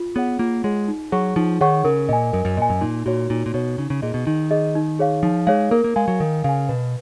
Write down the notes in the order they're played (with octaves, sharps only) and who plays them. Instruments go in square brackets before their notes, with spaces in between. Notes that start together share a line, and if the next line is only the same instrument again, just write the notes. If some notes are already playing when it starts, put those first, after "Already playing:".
Already playing: [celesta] F4
[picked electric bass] B3 [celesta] G#4 C#5 F#5
[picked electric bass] A#3 [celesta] F4
[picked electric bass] G#3 [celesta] G#4 C#5 F#5
[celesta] D#4
[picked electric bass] F#3 [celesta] G#4 C#5 F#5 C#6
[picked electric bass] F3 [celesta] D#4
[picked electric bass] D#3 [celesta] G#4 C#5 F#5 C#6
[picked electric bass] C#3 [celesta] A#4
[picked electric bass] A#2 [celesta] D#5 G#5
[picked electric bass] F#2 [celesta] A#4
[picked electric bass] F#2
[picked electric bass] A#2 [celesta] D#5 G#5
[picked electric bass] F#2
[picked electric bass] A#2 [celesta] D#4
[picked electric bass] A#2 [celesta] F#4 C#5
[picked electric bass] A#2 [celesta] D#4
[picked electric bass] A#2
[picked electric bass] B2 [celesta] F#4 C#5
[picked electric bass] C#3 [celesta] D#4
[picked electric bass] C#3
[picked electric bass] A#2 [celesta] G#4 D#5
[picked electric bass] B2
[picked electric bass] D#3 [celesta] D#4
[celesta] G#4 D#5
D#4
G#4 C#5 F5
[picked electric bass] F3 [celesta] D#4
[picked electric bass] G#3 [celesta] G#4 C#5 F5
[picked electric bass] A#3 [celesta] A#4
[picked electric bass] A#3
[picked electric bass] G#3 [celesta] F5 G#5
[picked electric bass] F#3
[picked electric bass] D#3 [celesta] A#4
[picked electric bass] C#3 [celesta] F5 G#5
[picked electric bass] B2 [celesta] B4